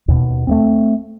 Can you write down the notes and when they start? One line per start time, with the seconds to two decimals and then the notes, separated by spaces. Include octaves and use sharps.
0.08 D#2 B2
0.47 A3 A#3 C4